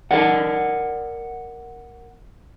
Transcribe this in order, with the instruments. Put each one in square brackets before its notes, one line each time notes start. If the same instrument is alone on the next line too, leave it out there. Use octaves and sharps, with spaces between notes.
[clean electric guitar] A4 A#4 D5 F#5